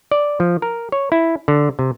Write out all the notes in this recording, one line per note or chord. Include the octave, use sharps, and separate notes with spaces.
D5
F3
A#4
C#5
E4
D3
C3